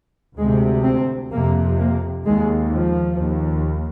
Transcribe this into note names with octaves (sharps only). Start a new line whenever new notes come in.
D2 C3 G#3
C4
F2 C3 A#3
A#3
D#2 G#3
F3
D#2